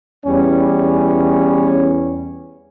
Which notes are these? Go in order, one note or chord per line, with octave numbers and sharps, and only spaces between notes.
E2 G3 C#4